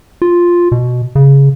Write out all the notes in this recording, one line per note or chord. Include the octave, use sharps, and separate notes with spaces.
F4
B2
C#3